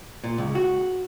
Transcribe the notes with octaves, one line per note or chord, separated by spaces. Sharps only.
A#2
C#2
F#4